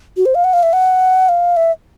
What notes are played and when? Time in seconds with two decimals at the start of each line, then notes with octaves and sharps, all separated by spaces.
0.17 F#4
0.26 C5
0.35 F5
0.44 F#5
0.53 F5
0.63 E5
0.73 F#5
1.29 F5
1.57 E5